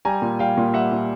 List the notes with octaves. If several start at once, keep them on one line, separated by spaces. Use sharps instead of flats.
G3 G#5 A#5
A#2
G3 F5 G5
A#2
G3 E5 F#5
A#2